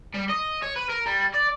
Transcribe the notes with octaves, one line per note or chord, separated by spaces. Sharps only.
G3
D#5
C#5
B4
A#4
G3
D5